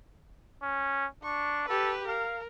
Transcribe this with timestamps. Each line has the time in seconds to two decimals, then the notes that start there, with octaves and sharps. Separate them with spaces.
0.62 C#4
1.23 D4 C#6
1.68 G4 A4 B4
2.08 A#4 F5